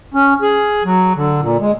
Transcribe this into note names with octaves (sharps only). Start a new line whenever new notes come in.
C#4
G#4
F#3
D3
A#2
G#3